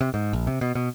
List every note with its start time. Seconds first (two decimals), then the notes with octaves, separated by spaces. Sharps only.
0.01 C3
0.14 G#2
0.33 A#1
0.47 C3
0.61 B2
0.75 B2